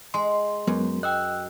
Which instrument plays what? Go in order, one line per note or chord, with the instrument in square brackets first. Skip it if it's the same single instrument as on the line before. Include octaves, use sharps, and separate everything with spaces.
[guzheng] G#3 [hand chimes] C6
[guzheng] F#2 [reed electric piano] F#3 G#3 B3
[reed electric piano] D#5 [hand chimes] G5 E6 F#6